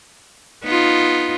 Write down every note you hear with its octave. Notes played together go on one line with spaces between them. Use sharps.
B3 D#4 F4